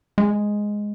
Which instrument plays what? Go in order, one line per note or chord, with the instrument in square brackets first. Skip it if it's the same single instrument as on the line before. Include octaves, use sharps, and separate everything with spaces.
[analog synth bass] G#3